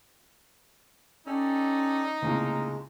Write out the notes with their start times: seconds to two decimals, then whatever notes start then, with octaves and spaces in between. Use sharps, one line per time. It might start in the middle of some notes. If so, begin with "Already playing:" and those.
1.27 C#4 D#4 G4 A4 D5
2.22 C#2 A2 C3 G#3 A#3